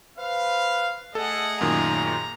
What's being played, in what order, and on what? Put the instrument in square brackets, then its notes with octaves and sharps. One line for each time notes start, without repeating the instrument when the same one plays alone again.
[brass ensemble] B4 C5 F5
[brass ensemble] A3 G#4 [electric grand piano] A4 [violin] D#5 F#5
[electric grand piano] F#2 A#2 D#3 [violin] A#5